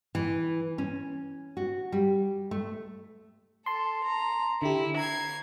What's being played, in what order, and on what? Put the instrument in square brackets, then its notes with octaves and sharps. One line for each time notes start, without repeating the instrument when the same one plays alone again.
[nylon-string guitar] E3
C#4
F#4
G3
A3
[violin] A4 [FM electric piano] A5 C6
[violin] A#5
[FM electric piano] D3 G4 [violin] E4
[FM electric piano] A#5 [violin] G#6 C7